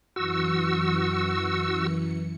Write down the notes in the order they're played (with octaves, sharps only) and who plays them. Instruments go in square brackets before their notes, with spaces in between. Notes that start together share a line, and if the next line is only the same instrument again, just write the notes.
[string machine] F#2 E3 C#7 [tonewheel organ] F#4 E6